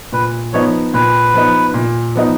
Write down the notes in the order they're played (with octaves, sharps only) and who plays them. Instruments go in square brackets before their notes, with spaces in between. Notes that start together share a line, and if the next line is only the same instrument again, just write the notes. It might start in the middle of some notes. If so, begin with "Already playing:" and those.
[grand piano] A#2 [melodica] B4
[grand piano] F3 B3 D#4 [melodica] C#5
[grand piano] A#2 [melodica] B4
[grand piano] F3 B3 D#4
A#2
F3 B3 D#4